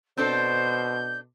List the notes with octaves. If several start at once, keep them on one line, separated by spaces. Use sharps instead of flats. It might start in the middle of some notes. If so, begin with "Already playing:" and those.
B2 C4 D4 A4 C5 G6